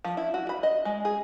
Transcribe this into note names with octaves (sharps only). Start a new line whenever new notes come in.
F3
E4
F#4
B5
D#5
G#3
G#4